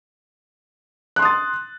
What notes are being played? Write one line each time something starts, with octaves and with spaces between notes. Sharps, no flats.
C6 D#6 F#6 A6